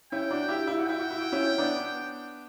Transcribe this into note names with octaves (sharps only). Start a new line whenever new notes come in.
C#4 E4 G5
D4 F#4
E4 G4
E4
F#4
E4 G5
F#4
E4
F#4
C#4 E4
B3 D4